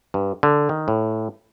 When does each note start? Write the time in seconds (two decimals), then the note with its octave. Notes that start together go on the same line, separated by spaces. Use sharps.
0.14 G2
0.43 D3
0.69 D#3
0.88 A2